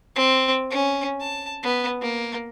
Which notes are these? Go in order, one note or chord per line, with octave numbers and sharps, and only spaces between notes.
C4
C#4
A5
B3
A#3